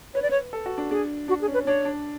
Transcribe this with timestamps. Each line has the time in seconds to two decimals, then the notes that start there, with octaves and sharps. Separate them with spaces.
0.14 B4 C#5
0.22 D5
0.31 C#5
0.53 A4
0.66 F#4
0.78 D4
0.90 D4 G#4
1.28 D4 F#4
1.41 G#4
1.47 C#4
1.54 B4
1.66 D4 C#5
1.85 D4